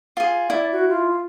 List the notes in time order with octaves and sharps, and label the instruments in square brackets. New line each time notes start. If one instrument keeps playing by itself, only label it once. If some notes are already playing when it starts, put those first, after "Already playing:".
[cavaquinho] F4 G#4
[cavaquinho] E4 [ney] D5
[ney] F#4
F4